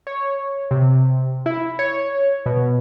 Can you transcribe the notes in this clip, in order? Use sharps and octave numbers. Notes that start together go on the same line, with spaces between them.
C#5
C3
E4
C#5
B2